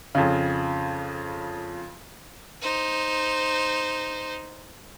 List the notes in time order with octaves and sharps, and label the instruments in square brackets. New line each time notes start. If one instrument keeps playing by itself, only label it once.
[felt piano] F2 C#3
[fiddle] D#4 C5